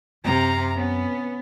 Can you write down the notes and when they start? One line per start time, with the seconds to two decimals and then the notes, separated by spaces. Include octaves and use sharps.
0.25 F#2 C3 F5 A#5
0.77 B3 C#4